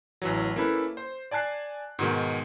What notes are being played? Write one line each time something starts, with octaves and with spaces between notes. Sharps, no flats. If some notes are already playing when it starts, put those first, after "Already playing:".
A1 E3 F#3
A#3 C#4 E4 A4 B4
C5
D5 G#5 A5 F#6 C7
G#2 B2 D#3 G#3